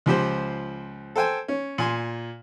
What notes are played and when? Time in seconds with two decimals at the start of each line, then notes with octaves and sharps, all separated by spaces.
0.06 C#2 F3 G4 C5
1.16 A4 C5 G5 G#5
1.48 C#4
1.78 A#2 G#5 C6